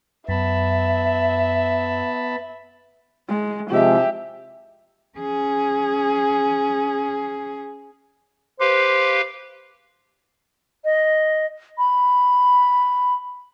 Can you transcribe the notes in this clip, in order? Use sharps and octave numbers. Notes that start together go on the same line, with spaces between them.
F#2 B3 E5 A5 B5
G#3
C3 F3 G#3 G4 E5
C#4 G#4
G4 B4 C5 F5
D#5
B5